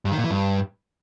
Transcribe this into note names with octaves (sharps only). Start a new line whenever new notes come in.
G2
D#3
A#2
E3
G2